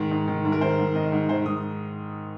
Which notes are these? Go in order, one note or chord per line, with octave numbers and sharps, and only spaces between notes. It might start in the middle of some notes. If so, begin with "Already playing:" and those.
Already playing: G#2 D#3
G#2
D#3
G#2
A#4
D#3 C5
G#2
D#3 D#5
G#2
D#3 C5
G#2 D#6